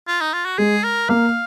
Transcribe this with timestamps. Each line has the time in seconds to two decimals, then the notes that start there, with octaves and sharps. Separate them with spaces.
0.07 F4
0.21 D#4
0.33 F4
0.45 F#4
0.58 G#3 G#4
0.84 A#4
1.09 A#3 F5